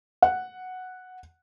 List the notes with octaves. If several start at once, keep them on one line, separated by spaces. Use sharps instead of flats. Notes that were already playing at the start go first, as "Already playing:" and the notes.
F#5